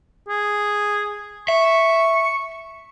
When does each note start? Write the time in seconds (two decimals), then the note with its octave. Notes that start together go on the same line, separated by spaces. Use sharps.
0.29 G#4
1.48 E5 C#6